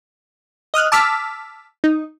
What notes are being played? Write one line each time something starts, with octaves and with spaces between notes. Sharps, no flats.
D#5 D#6 F6 F#6
A5 D6 E6 F6 B6
D#4